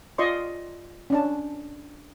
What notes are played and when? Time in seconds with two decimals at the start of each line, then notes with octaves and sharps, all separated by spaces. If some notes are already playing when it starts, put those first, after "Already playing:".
0.18 F4 D5 D#5 C6 C#6
1.10 C#4 D4 A5